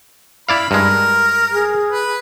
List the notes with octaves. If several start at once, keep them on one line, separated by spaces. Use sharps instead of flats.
E4 D5 F5 B5
G2 G#3 A#4
G#4
B4